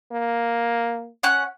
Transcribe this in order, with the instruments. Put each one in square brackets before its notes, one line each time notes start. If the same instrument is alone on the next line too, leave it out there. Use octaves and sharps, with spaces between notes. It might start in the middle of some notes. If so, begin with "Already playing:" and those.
[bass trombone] A#3
[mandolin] C#4 F#5 F#6